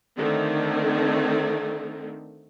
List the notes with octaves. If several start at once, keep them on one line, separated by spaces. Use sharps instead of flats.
D3 D#3 A3 C4